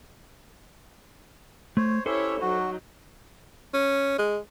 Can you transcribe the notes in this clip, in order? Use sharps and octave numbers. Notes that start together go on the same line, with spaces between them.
A3 C5 C#5
C#4 E4 G4 A4 C5 C#5 E5
F#3 D#4 F#4
C#4
G#3